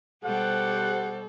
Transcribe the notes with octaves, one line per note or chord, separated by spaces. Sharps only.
B2 G3 G4 A4 C5 F#5